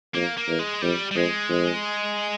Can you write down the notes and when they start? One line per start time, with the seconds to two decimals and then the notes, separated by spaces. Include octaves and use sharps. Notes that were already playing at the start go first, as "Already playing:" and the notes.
0.14 F2 A#3
0.37 A#3
0.47 E2
0.59 G#3
0.82 F2 G3
1.11 G3
1.16 F2 G#3
1.49 F2